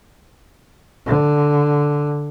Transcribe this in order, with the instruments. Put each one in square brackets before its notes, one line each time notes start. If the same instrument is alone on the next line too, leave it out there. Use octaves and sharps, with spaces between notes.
[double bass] D3